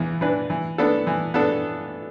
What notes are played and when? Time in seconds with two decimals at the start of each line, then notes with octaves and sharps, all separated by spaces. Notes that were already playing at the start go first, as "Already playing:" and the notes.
Already playing: E2 E3
0.21 E3 D4 B4
0.50 E3
0.78 B3 D4 A4
1.07 E3
1.34 B3 D4 A4